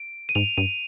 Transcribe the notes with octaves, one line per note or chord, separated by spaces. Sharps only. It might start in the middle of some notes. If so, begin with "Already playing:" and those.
Already playing: D7
D#7
G#2 F7
G2 D#7